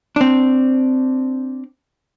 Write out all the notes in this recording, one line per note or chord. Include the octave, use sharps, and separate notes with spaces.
C4 D4